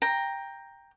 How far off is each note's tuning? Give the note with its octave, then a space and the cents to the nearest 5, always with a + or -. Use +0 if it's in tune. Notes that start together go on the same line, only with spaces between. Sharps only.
G5 +10 A#5 +0